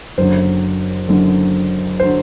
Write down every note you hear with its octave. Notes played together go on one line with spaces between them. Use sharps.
F#1 F#2 D3 F#3 C5
F#1 F#2 D3 F#3
D3 F#3 C5